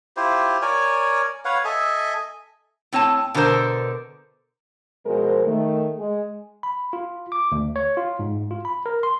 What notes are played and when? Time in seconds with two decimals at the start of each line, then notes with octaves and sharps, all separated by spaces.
0.17 E4 F4 G4 C5
0.62 A#4 C#5 D5 G#5
1.45 B4 C#5 F5 F#5
1.65 A4 D#5 E5 G#5
2.93 A2 C4 C#5 G#5 A5
3.34 B2 D3 A4 A#4 C5
5.06 B2 F3 G#3 G#4 A#4 C5
5.46 D#3 A3
5.98 G#3
6.63 B5
6.93 F4
7.32 D6
7.52 D2
7.76 C#5
7.97 F4
8.19 G#2
8.51 F4
8.65 B5
8.86 A#4
9.03 C6